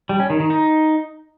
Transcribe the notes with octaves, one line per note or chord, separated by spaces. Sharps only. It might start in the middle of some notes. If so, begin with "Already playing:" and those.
G3
C#4
D#3
D#3
D#4